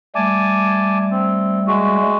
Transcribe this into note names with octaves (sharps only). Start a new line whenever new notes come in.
G3 A3 G#5 A5 D6
C4
G#3 F#4